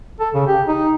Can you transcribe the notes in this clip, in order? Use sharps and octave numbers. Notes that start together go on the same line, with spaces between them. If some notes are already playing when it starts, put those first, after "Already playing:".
A4
C#3
G4
D#4